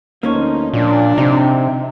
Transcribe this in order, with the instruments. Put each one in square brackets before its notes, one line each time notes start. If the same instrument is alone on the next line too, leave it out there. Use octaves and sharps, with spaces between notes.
[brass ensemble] D2 F3 D#4 [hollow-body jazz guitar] A#3 C#4 C#5
[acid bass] A#2 [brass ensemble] F3 F#3 D4
[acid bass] C3 [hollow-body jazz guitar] D#4